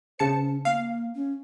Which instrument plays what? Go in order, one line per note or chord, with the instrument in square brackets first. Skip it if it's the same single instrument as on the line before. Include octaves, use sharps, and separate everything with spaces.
[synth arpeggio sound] C#3 A5 C#7 [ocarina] C5
[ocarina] C#4
[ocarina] A#3 [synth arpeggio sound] F5
[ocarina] C#4